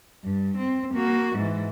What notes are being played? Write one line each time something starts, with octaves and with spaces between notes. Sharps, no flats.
G2
C4
A#3 F#4
G#2 E3